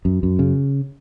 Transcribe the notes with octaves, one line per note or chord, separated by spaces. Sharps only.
F#2
F#2
C#3